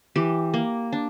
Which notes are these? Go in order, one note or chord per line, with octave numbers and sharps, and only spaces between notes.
E3 G4
A#3
D4